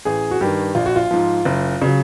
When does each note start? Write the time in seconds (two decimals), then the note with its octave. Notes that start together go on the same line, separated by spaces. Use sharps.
0.05 A1 G#4
0.31 F#4
0.41 G2 D#3 G4
0.75 A#1 F4
0.86 F#4
0.96 F4
1.11 G#2 F3
1.45 F#1
1.82 C#3 F#3